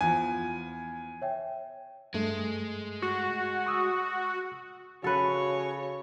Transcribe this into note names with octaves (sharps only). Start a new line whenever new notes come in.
E2 F3 G#5
C#5 E5 G5
G2 G#3 A3
F#4
C#6 D#6 E6
C#3 F#4 A4 B4 C#5